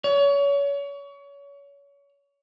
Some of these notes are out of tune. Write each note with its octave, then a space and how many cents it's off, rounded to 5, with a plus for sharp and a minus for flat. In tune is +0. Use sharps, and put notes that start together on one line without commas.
C#5 +30